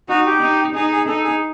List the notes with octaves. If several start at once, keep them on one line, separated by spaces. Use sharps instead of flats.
D#4 F#4
G4
D#4
D#4 G#4
G#4
D#4 A4
G#4